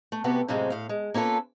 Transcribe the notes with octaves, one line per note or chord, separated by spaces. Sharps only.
A3
C3 B3 F#4 G4 B4
F#2 A2 C3 F3 G#3 C4
A2 F5
G#3
A#3 C#4 F4 A4 B4